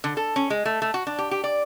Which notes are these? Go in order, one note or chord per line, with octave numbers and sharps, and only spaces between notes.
D3
A4
C#4
G#3
A3
A3
F#4
D4
G4
G4
D5